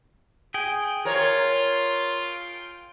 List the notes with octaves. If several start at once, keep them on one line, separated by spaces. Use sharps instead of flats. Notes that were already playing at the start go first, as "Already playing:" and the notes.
G#4 G5
F4 A#4 C#5